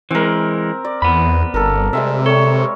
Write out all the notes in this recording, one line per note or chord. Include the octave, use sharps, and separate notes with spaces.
E3 G#3 C4 A#4
D5
E2 B3 B5
G1 A4 A#4
C3 G3 G#3 E5
A4 C#5 C#6